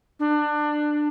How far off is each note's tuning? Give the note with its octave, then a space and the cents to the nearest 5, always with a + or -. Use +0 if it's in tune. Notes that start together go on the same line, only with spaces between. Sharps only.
D4 +20